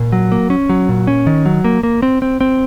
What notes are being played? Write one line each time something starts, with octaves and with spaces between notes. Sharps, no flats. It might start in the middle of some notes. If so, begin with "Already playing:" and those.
Already playing: A#2
F#3
A#3
C#4
F#3
A#2
C#4
D#3
F#3
A#3
A#3
C4
C4
C4